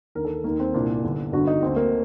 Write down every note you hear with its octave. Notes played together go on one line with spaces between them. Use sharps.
D#2 D3 A#4
A4
D#2 D#3 A#3
C4
C2 A#2 D4
G1 G2 D3
G1 G2 D3 F#4
D#4
D2 D3 C4
A#3